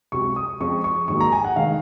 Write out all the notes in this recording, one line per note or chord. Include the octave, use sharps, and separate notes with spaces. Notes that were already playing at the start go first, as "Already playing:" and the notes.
C#2 C3 F#3 C#6
D#6
F2 C#3 F3 G#3 C4 C#6
C#6
G#1 G#2 F#3 A#3 C#6
A#5
G#5
F#5
F1 D#3 G#3 F5